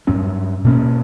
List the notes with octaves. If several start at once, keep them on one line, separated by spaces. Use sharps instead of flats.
G2 F#3 C#4
B2 A#3 C#4